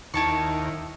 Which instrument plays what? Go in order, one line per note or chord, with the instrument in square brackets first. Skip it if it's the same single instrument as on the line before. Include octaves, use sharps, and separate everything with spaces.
[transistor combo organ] D#2 [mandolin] E4 A5 C#6